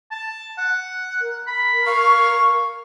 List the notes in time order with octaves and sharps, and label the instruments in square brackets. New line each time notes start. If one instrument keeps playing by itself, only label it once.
[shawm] A5
F#5
[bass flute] A#4
[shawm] B5
[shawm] F5 [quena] C#6